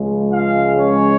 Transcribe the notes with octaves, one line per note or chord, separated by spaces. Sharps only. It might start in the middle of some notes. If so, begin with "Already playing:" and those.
Already playing: C#2 C#3 F3 G#3
F4 F5
C#4 C#5